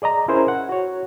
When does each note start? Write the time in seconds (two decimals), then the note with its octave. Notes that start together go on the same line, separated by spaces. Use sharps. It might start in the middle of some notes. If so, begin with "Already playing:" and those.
0.02 G#4 D5 D#5 A#5
0.28 C#4 E4 G#4 A#4 C5
0.48 F#5
0.69 F#4 C#5